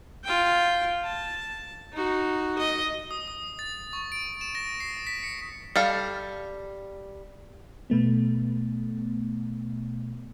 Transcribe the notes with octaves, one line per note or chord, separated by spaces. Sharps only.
F4 G5
A5
D#4 F#4
D#5
D#6
D#6
A6
C#6
D7
E7
A#6
C7
B6
C#7
G3 A4 F5
B2 A3 B3